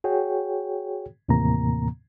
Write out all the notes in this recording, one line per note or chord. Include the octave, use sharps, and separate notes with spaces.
F#4 G#4 C#5 G5
D#2 A2 C3 E3 A#3 A#5